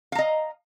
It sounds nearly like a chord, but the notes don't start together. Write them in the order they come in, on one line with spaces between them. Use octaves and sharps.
F5 A#5 D#5